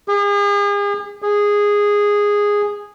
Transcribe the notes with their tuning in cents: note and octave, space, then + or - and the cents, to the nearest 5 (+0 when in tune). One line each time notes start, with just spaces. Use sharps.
G#4 -40
G#4 -10